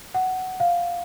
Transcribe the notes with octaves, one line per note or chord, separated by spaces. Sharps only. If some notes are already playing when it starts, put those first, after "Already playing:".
F#5
F5